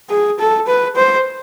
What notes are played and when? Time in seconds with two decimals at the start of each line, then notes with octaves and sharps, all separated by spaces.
0.10 G#4
0.39 A4
0.67 B4
0.96 C5